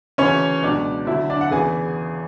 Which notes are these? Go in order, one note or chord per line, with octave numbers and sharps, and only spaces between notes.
D2 C#3 E3 C#4 C#5
C#2 B2 F#3 D4 D5
D2 D3 F#3 E4 E5
D4 D5
F#5
E2 C#3 E3 G#4 G#5